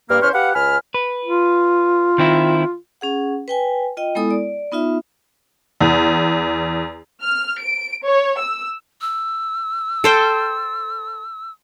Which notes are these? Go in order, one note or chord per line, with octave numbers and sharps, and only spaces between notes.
G2 A#3 F6
E2 C#4 B4 C5 C#6 F6
G4 B4 F5 F#5
C#2 G#5 B5 F6
B4
F4
D#3 C4 E4
C#4 G#4 F#5
B4 G5 G#5
F4 D#5 G5
G#3 B3 E4 A4 D#6
D5
B3 D#4 F4 E5
E2
F6
D7
C#5
E6
E6
A4 C5 G5